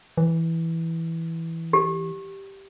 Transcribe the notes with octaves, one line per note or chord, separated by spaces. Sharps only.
E3
G4